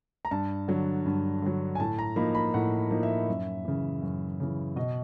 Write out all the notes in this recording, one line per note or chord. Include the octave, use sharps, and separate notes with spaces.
A#5
G2 A5
D3 F#3
G2
D3 F#3
G#5
A2 A5
A#5
F3 A#3 D#4 B5
B5
A2 F#5
F3 A#3 D#4
E5
F#2
C#3 E3
F#2
C#3 E3
B2 D#5